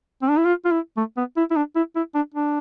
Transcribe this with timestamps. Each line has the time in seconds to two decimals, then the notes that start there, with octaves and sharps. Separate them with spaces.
0.22 C4
0.30 D4
0.38 E4
0.45 F4
0.65 F4
0.71 E4
0.97 A3
1.17 B3
1.37 E4
1.51 E4
1.56 D4
1.76 E4
1.96 E4
2.15 D4
2.34 D4